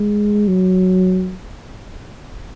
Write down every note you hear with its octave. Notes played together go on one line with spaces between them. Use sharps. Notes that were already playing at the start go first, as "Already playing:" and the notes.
Already playing: G#3
F#3